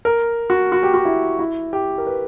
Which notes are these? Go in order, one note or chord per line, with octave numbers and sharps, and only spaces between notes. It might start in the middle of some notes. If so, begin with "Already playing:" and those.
A#4
F#4
F#4
G4
F#4
E4
E4
G4
A#4
B4